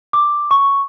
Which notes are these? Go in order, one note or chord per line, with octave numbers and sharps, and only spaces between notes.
D6
C#6